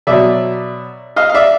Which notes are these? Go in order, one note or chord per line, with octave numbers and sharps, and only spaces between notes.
B2 F#3 D5 E5
D#5 F5
F5
D5 E5